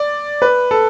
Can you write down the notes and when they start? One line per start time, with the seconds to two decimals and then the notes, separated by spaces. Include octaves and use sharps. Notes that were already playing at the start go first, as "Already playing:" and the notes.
Already playing: D5
0.42 B4
0.71 A4